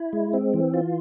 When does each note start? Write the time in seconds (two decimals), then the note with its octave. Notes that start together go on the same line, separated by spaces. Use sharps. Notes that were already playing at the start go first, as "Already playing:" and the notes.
Already playing: E4
0.13 G#3
0.33 C4
0.54 E3
0.74 F4